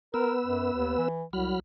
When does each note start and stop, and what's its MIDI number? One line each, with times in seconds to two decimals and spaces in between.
0.14 1.08 59
0.14 0.34 70
0.14 1.08 71
0.14 1.08 88
0.45 0.69 42
0.73 0.98 39
0.98 1.23 52
1.33 1.54 36
1.33 1.60 54
1.33 1.60 83
1.33 1.60 89